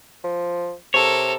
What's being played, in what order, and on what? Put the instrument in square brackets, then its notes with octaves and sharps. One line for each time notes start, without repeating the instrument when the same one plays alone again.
[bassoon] F3
[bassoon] C3 [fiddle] A4 A#4 [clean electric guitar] C#5